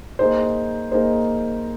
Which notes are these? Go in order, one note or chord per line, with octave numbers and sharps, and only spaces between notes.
A#3 D#4 G#4 C5
A#3 D#4 G#4 C5